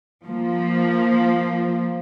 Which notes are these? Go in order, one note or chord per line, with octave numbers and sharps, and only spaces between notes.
F3 A#3